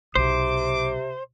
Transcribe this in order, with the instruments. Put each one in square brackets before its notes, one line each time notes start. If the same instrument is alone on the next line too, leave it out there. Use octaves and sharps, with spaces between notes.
[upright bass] B1 [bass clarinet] C3 [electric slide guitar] C5 [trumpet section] D6